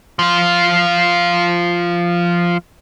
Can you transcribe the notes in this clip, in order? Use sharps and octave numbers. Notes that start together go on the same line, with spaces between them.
F3 F4